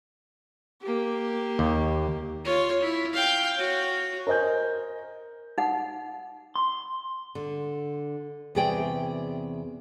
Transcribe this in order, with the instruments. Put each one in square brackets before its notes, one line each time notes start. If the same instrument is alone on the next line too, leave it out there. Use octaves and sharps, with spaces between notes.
[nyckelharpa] A#3 G4
[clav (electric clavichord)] D#2
[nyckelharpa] F4 C#5
E4
F5 G5
F#4 C#5
[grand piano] A#4 C5 D#5 G#5 G6
[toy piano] D#4 F#5
[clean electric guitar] C6
[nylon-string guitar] D3
E2 C3 F#4 G#4 D5 G5